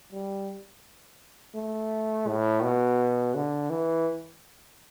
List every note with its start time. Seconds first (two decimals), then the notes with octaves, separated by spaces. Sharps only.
0.12 G3
1.55 A3
2.27 A2
2.63 B2
3.35 D3
3.70 E3